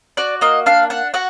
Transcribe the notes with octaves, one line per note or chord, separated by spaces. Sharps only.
F#4 D5
A#3 D#5
D4 F5
D4 F#5
F#4 F#5